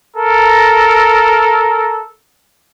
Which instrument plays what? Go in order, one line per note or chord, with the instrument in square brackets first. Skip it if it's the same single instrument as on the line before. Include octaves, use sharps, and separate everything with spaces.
[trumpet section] A4 A#4